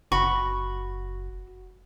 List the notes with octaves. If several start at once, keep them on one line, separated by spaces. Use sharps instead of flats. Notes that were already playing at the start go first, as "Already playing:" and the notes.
F#1 F#4 B5 C#6